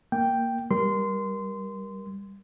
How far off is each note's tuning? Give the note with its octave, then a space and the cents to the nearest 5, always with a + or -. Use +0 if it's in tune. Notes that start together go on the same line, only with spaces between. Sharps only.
A#3 -5 G5 +0
G3 +0 A#4 +25 C6 -20